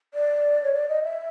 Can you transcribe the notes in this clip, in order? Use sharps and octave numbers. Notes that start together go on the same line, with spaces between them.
D5
C#5
D5
D#5
E5